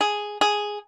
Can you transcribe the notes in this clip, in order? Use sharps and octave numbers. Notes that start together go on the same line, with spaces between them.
G#4
G#4